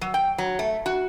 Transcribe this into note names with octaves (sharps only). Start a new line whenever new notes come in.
F#3
G5
F#3
A3
F#4